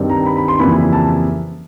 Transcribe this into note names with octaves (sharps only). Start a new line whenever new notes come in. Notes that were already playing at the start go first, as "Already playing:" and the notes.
Already playing: G2 D#3 G3 C4
A#5
B5
B5
C6
F2 C#3 E3 G3 A#3 B5
A5